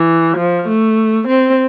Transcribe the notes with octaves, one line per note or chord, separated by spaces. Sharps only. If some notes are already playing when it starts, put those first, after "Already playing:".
Already playing: E3
F3
A3
C4